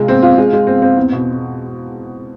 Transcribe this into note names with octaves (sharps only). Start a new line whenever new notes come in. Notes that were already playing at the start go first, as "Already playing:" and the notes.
Already playing: C3 G#3 F4
C4
F4
G#3
G#3
C4
C4
E2
B2